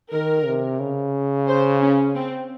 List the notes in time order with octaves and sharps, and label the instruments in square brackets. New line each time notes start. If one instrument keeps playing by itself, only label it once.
[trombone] D#3 [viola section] A#4
[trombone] C3
C#3
[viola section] C5
C#4
C4